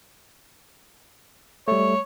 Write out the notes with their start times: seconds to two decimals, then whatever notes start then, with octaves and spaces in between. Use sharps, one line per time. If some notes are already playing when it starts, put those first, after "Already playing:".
1.68 G3 A3 C#5